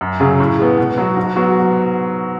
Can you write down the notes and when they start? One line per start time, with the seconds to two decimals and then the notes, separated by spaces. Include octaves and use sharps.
0.01 F#2
0.20 C#3 F#3 C#4 G#4
0.40 A2
0.59 G#3 B3
0.78 B2
0.98 F#3 B3 F#4
1.17 G#2
1.36 F#3 B3 F#4